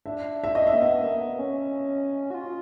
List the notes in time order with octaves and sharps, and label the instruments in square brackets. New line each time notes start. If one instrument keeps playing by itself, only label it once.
[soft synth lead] D4 [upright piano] E5
[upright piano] E5
D#5
E5
[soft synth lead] A#3
[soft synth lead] B3 [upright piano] E5
[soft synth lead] A#3
B3
C#4
F#4
F4